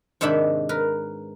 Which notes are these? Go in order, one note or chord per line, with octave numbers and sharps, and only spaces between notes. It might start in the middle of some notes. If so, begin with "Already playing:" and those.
G#2 C3 D#3 D4 E5 B5
A#4 B4